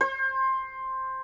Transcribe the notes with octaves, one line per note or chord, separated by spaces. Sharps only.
C5